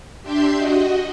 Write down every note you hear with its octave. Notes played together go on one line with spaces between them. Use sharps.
D4 G4 E5 C6 G6
F#4 D#5